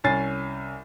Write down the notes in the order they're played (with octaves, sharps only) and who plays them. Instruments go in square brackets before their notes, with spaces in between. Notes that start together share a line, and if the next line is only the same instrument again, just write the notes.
[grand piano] C2 C#4 G#5 A6 C7